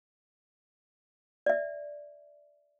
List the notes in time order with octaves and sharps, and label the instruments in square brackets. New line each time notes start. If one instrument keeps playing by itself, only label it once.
[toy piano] D5 E5